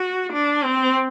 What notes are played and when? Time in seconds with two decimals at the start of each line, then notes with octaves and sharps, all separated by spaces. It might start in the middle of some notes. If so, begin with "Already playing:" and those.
Already playing: F#4
0.33 D4
0.64 C4